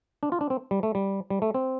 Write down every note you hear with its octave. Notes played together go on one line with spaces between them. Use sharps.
D4
F4
D4
C4
G3
A3
G3
G3
A3
C4